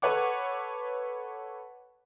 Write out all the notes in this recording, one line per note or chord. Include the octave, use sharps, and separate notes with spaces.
A4 B4 C#5 F#5 D6